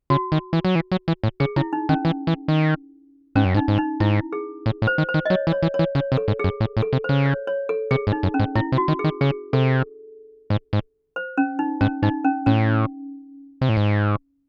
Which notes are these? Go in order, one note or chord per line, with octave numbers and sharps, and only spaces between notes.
C#3 F#4
D#3
E3
F#3
E3
F#3
E3
A2
C#3 G#4
C#3 E4
D#4
D#3 C#4
E3
E3
D#3
G#2 C#4
F#2
G#2 D#4
G#2
D#4
G#2 E4
G#4
A2
A2
C5
D#3
C5
D#3
D#5
F#3 C#5
E3
C#5
E3
C#5
E3
C#3 C#5
C3
A4
G#2
G#4
F#2
A2
A2
A4
C3
C5
C#3
C#5
C#5
A4
C3 G#4
G#2
D#4
F#2
C#4
G#2
A2 E4
C3
F#4
D#3
G#4
D#3
C#3 G#4
C3 A4
G#2
G#2
C5
C#4
D#4
G#2 C#4
G#2 D#4
C#4
A2 C#4
C3
A2
G#2